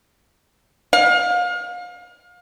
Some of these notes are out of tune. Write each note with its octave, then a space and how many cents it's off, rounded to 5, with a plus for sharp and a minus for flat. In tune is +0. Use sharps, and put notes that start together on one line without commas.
F5 +30